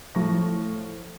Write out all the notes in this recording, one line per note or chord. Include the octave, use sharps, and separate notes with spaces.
A2 F3 C#6 A#6